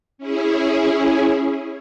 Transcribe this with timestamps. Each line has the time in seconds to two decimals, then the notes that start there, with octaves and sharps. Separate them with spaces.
0.18 C#4 E4 G#4